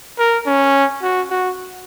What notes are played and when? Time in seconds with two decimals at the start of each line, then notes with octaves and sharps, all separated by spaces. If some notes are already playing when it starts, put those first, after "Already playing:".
0.19 A#4
0.46 C#4
1.02 F#4
1.30 F#4